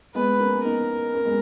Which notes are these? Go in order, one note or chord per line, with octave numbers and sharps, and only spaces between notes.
G#3 B3 B4
A#3 C#4
B3 D#4 A#4
A#3 C#4
G#3 B3